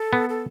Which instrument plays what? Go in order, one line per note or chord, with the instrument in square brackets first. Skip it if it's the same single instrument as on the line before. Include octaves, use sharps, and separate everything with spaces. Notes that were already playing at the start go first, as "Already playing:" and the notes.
Already playing: [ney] A4
[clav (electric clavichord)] B3
[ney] A4